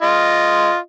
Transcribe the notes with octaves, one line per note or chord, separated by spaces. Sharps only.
F4 D#5